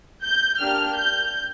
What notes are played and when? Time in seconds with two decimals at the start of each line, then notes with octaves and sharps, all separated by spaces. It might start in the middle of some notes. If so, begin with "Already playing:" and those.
0.23 G6
0.60 A#3 D4 G4 F6
0.98 G6